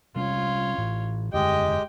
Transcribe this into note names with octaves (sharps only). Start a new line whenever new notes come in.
C3 G3 C#4 F4 C#5
A2 E3
E1 F#2 D3 G#3 G4 D#5 G5